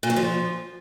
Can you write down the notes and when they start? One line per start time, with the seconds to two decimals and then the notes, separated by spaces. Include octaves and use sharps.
0.03 A#2
0.10 F#3
0.16 F3